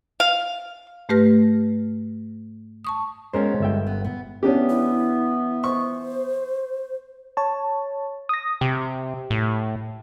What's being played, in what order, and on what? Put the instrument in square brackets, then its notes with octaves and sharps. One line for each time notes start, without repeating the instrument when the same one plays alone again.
[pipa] F5
[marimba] G#2 A3 G4 B4 F6 A#6
A5 C#6 D#6
[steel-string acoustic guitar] G#3 B3 [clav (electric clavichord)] C#4 A#4 C5
[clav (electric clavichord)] G1 E5 G5
[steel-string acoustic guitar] B3
B3
[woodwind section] E3 B3 [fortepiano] C#4 D4 G4
[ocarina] E4
[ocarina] C5 [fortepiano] C#6
[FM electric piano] C#5 A5
D#6 A#6
[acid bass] C3 [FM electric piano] G4
[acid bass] A2